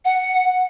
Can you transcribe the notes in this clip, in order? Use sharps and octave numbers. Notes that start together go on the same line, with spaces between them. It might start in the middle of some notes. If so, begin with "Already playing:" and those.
F#5